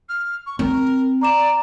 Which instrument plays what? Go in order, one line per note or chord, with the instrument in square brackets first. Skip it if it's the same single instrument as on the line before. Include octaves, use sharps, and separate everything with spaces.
[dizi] F6
C#6
[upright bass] C4 [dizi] A#4
[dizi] D5 [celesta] A#5 D6 E7